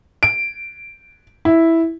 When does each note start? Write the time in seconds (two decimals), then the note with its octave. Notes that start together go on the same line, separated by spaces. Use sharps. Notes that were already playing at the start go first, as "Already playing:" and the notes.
0.23 D7
1.45 E4